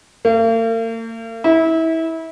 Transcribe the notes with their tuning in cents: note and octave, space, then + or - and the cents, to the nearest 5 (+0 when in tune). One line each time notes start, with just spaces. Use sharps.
A#3 -45
E4 -25